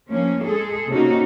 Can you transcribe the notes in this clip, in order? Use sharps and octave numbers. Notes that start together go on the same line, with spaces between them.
F3 A#3 C#4
G#3 G#4 A4
C3 A#3 C#4 D#4 F#4